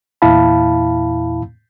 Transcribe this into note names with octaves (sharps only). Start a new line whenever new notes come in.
E2 A#2 E4 F5 A5 B5